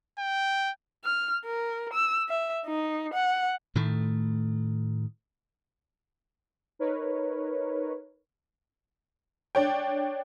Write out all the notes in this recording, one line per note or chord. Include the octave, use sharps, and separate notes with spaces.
G5
F6
A#4
E6
E5
D#4
F#5
A2 D#3 A3
D#4 A#4 B4 C#5
D4 C#5 G5